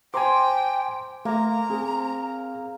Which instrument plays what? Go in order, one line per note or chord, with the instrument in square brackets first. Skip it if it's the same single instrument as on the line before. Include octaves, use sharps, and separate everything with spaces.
[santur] C5 [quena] G5 [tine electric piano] G#5 A#5 D6
[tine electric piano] A3 [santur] A#3 [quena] A#5
[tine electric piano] C4 G#4